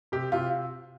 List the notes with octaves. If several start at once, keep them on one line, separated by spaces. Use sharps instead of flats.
C3 G4
C3 F4